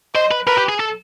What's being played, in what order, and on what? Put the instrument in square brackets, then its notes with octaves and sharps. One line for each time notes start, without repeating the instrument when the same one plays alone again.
[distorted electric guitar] C5 [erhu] D#5
[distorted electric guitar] B4
[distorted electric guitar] A#4 [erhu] B4
[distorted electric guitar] G4
G#4
A4